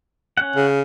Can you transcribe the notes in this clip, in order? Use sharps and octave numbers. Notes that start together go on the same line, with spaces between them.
C#4 F#5
C#3